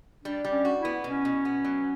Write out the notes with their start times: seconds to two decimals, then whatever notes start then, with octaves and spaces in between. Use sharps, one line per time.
0.24 G3 D4
0.45 G3
0.51 C#4
0.65 F#4
0.79 E4
0.85 B3
1.04 B2 C#4
1.25 B2
1.45 B3
1.65 F#3